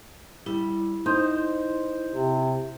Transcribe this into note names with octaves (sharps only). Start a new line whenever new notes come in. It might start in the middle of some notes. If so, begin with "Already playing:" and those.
G3 E4
D#4 C5
C3